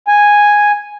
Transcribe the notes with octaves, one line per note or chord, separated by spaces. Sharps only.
G#5